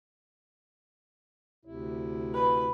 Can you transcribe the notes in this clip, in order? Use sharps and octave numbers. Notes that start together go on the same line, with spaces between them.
D2 C3 E4
B4